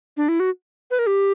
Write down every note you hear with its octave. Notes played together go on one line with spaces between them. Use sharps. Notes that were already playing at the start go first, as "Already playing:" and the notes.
D4
E4
F#4
B4
A#4
G4